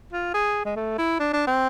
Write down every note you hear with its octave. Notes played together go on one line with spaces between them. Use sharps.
F4
G#4
G#3
A3
E4
D4
D4
C4